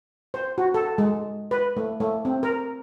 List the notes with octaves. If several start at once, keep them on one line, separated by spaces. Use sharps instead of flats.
C5
F#4
A4
G#3
B4
A3
A3
C4
A#4